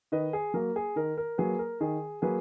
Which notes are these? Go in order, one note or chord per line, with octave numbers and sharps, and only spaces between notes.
D#3 B4 D#5
G#4
F#3 A#3 A#4
G#4
D#3 A#4
A#4
F#3 A#3 G#4 B4
A#4
D#3 G#4
F#3 A#3 G#4 B4